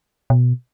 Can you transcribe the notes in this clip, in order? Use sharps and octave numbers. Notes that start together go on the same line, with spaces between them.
B2